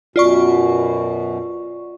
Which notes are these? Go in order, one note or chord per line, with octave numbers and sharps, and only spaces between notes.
F#2 B2 F4 D5 C#6